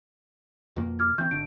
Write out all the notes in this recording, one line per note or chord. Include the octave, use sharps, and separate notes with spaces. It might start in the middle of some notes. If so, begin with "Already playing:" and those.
F2 B2 A#3
D6 F6 G#6
E3 C4 C#6 G6
G#1 D3 D7